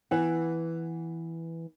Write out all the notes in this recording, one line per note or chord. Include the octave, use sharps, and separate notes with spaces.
E3 B3 F#5